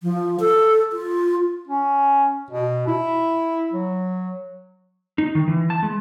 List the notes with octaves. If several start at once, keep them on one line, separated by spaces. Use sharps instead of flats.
F3
A4
F4
C#4
B2
E4
F#3
D#4
D#3
E3
A5
G#3